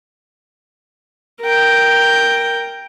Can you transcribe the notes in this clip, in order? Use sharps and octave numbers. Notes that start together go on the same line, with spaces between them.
A#4 G5